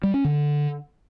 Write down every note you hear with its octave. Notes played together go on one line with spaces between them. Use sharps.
G3
C#4
D3